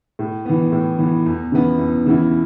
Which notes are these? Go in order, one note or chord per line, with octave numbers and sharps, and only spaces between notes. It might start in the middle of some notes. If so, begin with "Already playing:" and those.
A2
E3 B3
A2
E3 B3
E2
C#3 E3 B3 E4
E2
C#3 E3 B3 E4